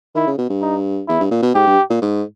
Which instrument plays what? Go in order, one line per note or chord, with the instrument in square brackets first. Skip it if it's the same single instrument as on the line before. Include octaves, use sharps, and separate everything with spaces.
[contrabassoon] D#3 [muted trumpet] E4
[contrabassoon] C#3
B2
G2
[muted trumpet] D#4
[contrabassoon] E2 [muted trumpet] E4
[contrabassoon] G2
A#2
B2
[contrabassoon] G#2 [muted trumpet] G4
[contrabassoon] G2
A#2
G#2